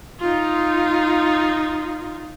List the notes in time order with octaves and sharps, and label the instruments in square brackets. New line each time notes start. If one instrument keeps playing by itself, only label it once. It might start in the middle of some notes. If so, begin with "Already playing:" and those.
[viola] D#4 F4